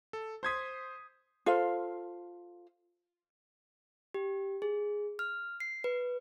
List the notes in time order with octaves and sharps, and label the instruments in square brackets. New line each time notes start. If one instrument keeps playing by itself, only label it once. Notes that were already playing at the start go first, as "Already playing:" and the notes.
[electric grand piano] A4
[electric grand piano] C5 D#6 [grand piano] C6 G#6 B6
[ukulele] F4 A4 C5 F5
[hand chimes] G4
G#4
F6
C7
B4